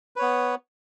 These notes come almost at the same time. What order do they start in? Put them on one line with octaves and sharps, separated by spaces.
B4 C#5 B3